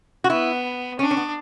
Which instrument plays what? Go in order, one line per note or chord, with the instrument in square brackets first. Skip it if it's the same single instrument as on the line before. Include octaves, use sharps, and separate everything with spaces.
[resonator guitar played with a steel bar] F#4
[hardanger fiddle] B3 [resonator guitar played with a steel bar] E4
[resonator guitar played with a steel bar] C#4 [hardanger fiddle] D4
[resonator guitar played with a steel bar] C#4
B3